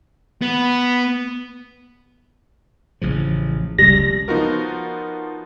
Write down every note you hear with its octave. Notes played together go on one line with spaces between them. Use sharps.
B3
A1 C#3 F3
F1 C#2 G3 A#6
F3 B3 D#4 F4 F#4 A#4